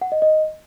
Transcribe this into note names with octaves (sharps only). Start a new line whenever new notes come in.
F#5
D#5
D#5